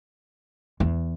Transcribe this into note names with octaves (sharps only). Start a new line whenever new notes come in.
E2